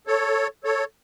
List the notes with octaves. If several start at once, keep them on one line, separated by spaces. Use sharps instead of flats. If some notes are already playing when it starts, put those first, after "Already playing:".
A4 C#5
A4 C#5